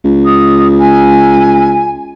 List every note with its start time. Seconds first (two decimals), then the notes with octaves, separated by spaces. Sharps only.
0.04 C#2
0.25 D#6
0.79 G#5